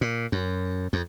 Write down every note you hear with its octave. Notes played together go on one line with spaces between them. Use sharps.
A#2
F#2
F2